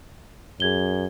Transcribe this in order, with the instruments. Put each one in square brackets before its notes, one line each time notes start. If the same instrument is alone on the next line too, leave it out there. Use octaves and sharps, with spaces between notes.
[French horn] F#2 [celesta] G#4 G#6 G7